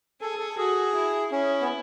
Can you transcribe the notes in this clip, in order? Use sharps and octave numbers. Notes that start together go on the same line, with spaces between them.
G#4 A4
A4
F#4 G#4
E4
C#4 E4
B3